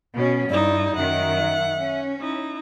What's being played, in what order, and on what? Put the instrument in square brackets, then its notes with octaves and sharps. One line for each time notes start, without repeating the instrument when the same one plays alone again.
[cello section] B2 C#4
[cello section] G2 [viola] D#4 E4 [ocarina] D5
[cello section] F#2 D#3 [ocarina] E5 [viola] F#5
[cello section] C#4
[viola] D#4 E4